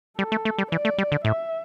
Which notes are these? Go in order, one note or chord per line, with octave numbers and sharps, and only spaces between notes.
G3 A4
A3
A3
G3
E3 D5
A3
G3
D3
A2 E5